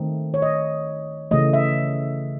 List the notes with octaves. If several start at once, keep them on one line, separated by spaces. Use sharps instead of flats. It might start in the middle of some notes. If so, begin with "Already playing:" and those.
Already playing: D#3 A3 C4 D#4
C#5
D#5
C#3 E3 A3 D#5
E5